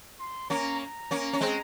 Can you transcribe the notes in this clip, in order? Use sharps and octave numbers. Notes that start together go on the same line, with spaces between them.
C6
A#3 C#4 A#5
A#5
A#3 C#4
C#4
G#3 C4